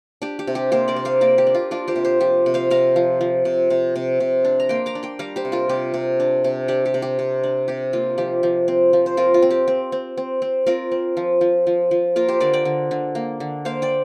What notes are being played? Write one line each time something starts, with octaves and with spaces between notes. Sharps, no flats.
D4 G4
G4
C3
G4
A#3 G4 C5
A#4 D5
C3
C5 F5
A#3 A#4 D5
G4
D4
F4
D4 F4 A#4
G4 C5
C3
G4 C5
F3 G4
C3
C5 F5
C3 F5 A#5
F3
F3
C3
C3
C3
C3
D4
A#5
A#3 G5 C6
A#5 D6
D4
G5 C6
G3 F5 A#5
G4 C5
C3
F4 A#4
C3 G4
C3
D4
C3
D4 G4
G4
C3
G4
C3
D4
C3 G4
A#3 F4
F3 G4
F3
C4
F3
C5
C4 F4 A#4
F4
C4
G4
C4
C4
C4
C4
C4 F4 A#4
C4
F3
F3
F3
F3
A#3 F4 A#4
G4 C5
D3 A#4 D5
D5 G5
D3
D3
A#3
D3
A#3 C5 F5
D5 G5